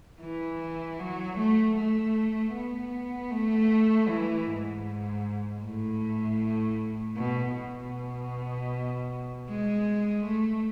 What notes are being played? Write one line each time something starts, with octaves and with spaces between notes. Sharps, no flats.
E3
F#3
A3
A3
B3
A3
E3
G#2
A2
B2
B2
G#3
A3